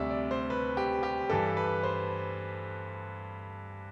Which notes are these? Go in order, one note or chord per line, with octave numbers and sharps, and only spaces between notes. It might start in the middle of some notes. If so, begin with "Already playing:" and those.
Already playing: D2 C3 G3 D5 E5
D5
C5
B4
G4
G4
G2 E3 G3 A4
B4
C5